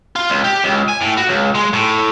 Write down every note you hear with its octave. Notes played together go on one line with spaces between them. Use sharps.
F4
C#2
G4
C#2
G#5
A2
F#4
C#2
G#3
A2